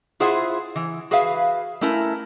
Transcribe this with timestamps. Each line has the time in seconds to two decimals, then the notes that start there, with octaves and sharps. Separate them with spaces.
0.20 E4 F4 G#4 C5 E5 F#5
0.76 E3
1.11 F#4 G#4 B4 E5 F5
1.81 A3 C#4 E4 A#4